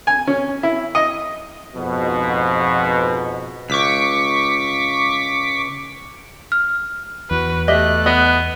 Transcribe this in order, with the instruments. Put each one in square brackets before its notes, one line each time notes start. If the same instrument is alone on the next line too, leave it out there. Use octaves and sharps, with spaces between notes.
[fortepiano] G#5
C#4
E4
D#5
[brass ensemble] F2 G#2 B2
[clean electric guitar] C#2 [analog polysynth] C#6 D6 B6
[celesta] F6
[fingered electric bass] E2 [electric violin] F#4 B4
[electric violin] A3 F#6 [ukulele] G4 D#5 E5
[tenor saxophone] B3 [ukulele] D#5